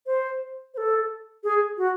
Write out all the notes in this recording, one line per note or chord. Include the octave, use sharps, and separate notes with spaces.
C5
C5
A4
G#4
F#4